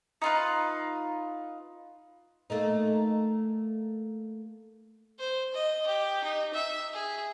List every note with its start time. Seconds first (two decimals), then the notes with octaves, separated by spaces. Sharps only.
0.22 D#4 F4 B4
2.50 A3 A#3 D#4
5.19 C5
5.54 D#5
5.87 G4
6.24 D#4
6.54 E5
6.93 G#4